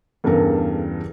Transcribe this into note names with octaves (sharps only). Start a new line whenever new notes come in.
E2 G2 C#3 A4 A#4